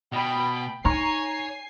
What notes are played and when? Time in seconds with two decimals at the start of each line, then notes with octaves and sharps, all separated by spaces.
0.12 B2 G5 B5
0.85 D#4 C#5 G#5 A#5 C#6 C7